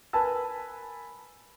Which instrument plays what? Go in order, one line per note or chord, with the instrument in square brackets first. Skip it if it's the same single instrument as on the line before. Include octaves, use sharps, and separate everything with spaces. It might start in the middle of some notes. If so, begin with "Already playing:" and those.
[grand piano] A#4 B4 G#5 A5 E6